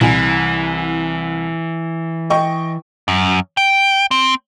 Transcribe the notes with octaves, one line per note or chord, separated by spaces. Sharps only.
C2 E3 G#5
D#5 G5 C#6
F#2
G5
C4